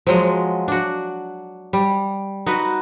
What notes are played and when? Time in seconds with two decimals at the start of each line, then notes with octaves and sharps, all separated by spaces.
0.07 F3 F#3 G#3
0.68 D4 F#4
1.73 G3
2.46 D#4 F#4 B4